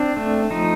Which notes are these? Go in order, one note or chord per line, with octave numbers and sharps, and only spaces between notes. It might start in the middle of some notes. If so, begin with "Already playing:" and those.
Already playing: C4 D4
A3
F3 D#4